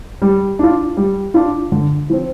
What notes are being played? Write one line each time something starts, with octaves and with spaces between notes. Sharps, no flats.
G3
D4 F4
G3
D4 F4
D3
F3 C4